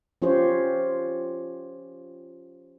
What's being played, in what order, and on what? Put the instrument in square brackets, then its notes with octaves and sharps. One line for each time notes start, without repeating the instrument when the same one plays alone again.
[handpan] F3 C#4 F4 G4 C5 C#5